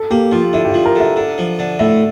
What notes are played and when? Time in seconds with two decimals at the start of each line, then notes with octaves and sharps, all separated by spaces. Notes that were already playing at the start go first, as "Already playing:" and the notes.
Already playing: A4
0.11 A#3 G4
0.32 F3 F4
0.53 D3 E4
0.65 G4
0.69 F3 F4
0.85 A#4
0.95 D3 E5
1.16 D3
1.38 F3
1.59 D3
1.79 A2 E5